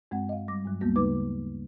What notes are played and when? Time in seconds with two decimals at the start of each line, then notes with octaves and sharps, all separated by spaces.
0.11 G2 G#3 C4 F#5
0.29 D#5 F5
0.48 G3 D6 A#6
0.65 G2 F#3 G#3
0.81 D2 G3 A#3 B3 F#4
0.96 C#3 G#3 D#4 B4 D6